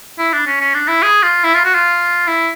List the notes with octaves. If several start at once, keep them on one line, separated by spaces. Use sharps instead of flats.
E4
D4
C#4
C#4
D4
E4
G#4
F4
E4
F4
F#4
F4
E4